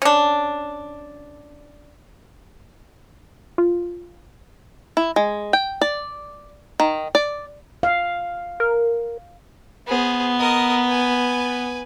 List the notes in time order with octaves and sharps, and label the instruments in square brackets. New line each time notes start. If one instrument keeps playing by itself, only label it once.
[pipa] C#4 D4
[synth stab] F4
[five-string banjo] E4
G#3
G5
D5
D#3
D5
[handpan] F5
[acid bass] A#4
[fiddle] B3 [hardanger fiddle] G#4 C5
[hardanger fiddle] A#4 D#5
B4 G#5